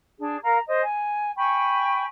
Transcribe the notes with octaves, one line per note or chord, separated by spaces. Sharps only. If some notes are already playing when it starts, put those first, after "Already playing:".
D4 G#4
A#4 F5 A#5
C5 D#5
G#5
G5 G#5 B5 C#6